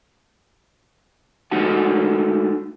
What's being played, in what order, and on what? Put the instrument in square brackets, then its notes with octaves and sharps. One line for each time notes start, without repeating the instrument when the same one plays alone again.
[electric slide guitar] G#3 A3 D#4 F#4 F#5 A5